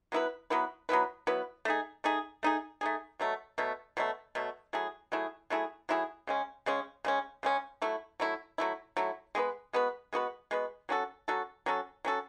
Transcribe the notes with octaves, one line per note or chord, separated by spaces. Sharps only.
F#3 B3 E4 B4
F#3 B3 E4 B4
F#3 B3 E4 B4
F#3 B3 E4 B4
A3 D#4 G#4
A3 D#4 G#4
A3 D#4 G#4
A3 D#4 G#4
B2 F#3 A3
B2 F#3 A3
B2 F#3 A3
B2 F#3 A3
F#3 A3 E4 G#4
F#3 A3 E4 G#4
F#3 A3 E4 G#4
F#3 A3 E4 G#4
C#3 G#3 C#4
C#3 G#3 C#4
C#3 G#3 C#4
C#3 G#3 C#4
F#3 A3 E4
F#3 A3 E4
F#3 A3 E4
F#3 A3 E4
G#3 B3 F#4 B4
G#3 B3 F#4 B4
G#3 B3 F#4 B4
G#3 B3 F#4 B4
F#3 C#4 F#4 A4
F#3 C#4 F#4 A4
F#3 C#4 F#4 A4
F#3 C#4 F#4 A4